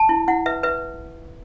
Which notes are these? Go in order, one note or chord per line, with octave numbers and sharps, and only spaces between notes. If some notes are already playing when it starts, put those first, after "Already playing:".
Already playing: A5
E4
E4 F#5
B4 E5
B4 E5